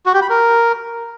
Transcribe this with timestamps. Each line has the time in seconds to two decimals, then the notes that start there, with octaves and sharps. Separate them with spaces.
0.06 F#4
0.14 G4
0.22 B5
0.30 A#4